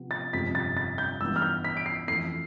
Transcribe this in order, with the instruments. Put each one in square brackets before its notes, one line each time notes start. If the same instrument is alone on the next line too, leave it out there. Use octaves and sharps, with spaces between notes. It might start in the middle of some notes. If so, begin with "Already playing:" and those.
Already playing: [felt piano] C3 F3 B3
[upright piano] A6
[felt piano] G1 F2 C3 [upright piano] B6
[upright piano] A6
A6
G6
[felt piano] G2 E3 B3 [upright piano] E6
[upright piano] F6
G6
B6
D7
C7
[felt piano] F2 E3 A3 [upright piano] C7